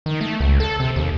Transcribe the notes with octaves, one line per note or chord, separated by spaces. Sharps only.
D#3
A3
C#2
A4
C3
D#2